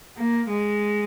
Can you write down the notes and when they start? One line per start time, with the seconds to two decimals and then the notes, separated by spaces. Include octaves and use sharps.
0.17 A#3
0.49 G#3